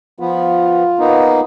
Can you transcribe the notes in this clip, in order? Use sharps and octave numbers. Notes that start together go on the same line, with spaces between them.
F3 B3 F4
A#3 B3 D#4